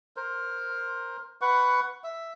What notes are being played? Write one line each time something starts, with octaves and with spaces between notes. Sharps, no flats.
A#4 C5
B4 F#5 C#6
E5